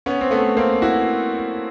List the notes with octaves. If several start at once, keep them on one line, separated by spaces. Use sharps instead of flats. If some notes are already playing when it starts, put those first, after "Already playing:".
B3 C#4
C4
A3 B3
A#3 C4
E4 F#4